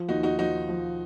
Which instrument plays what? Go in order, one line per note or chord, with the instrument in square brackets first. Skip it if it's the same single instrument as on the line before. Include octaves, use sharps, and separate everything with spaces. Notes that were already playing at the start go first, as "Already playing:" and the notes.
Already playing: [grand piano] F3
[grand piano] D#2 [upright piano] D#4 F#4
[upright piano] D#4 F#4
[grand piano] F3 [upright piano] D#4 F#4
[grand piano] F3